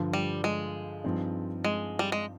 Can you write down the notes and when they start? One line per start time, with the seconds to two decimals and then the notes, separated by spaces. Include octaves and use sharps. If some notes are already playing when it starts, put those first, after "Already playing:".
Already playing: G2 D3 F3
0.13 G3
0.44 G#3
1.04 G2 F3 C4 D#4
1.64 G#3
1.99 G3
2.12 G#3